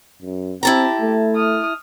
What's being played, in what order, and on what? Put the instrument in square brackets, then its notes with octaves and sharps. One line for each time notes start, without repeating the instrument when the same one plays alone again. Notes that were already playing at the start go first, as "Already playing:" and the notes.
[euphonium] F#2
[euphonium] C4 [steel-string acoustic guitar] E4 A5 A#5 [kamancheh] G4
[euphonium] A3
[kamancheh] D#6 F6